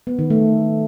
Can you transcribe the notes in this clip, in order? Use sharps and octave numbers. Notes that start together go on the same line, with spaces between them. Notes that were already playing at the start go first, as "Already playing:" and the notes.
B3
D#3
A3